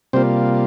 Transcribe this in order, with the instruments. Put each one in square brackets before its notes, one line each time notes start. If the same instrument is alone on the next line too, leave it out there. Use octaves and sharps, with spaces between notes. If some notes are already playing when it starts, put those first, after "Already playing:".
[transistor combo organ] C3 G3 A#3 C4 F4 C5